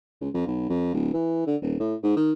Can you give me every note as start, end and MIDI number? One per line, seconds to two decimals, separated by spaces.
0.21 0.29 37
0.34 0.47 41
0.47 0.69 35
0.69 0.91 41
0.94 1.13 26
1.13 1.44 52
1.47 1.56 50
1.62 1.78 27
1.80 1.95 45
2.03 2.16 44
2.16 2.33 51